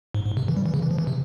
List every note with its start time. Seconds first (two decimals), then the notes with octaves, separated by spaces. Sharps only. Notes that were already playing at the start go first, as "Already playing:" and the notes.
0.15 G#2
0.26 G#2
0.37 C3
0.48 E3
0.57 G3
0.66 E3
0.74 C#3
0.82 E3
0.91 F3
0.99 E3
1.07 C3